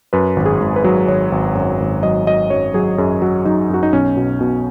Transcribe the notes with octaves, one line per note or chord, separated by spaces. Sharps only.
F#2 B4
G#1
G#4
G#1
B4
F#3
G#1 C#5
G#1
F#2
G#1
F#3 D#5
F#3 D#5
F#2 C#5
F#3 G#4
F#2 G#4
F#3
F#3 D#4
F#2 F#4
D#4
B1 C#4
B2
B2